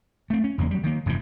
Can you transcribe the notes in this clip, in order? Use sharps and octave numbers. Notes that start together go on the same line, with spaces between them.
A3 C4
C#4
F#1 E2 A#3 C#4
F#3 G3
D#3 A#3
F1 G2 C3 E3